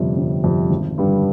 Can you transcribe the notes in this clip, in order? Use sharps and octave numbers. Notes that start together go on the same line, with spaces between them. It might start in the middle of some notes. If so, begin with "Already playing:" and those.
Already playing: G1 F2 C3 G3
G1
F2 C3 G3
G#1
G2 D3 G3